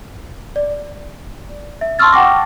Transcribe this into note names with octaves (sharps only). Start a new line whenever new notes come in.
D5
E5
A5 C6 C#6 E6 F6 A6
F#5 G5 A5 C#6 D6 A#6